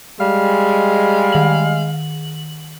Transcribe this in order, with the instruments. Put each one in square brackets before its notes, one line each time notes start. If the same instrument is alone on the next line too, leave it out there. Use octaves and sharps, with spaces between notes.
[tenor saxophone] G3 [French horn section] G#3 [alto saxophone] F5
[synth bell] D#3 F#7